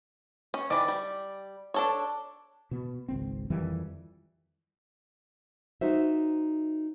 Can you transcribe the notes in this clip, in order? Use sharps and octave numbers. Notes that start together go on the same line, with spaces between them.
C#4
D#3 E3 D5
G3
D4 A4 C#5
B2 B3
G#1 C#2 C4
F2 D#3 E3 G3
D#4 F#4 C5 E5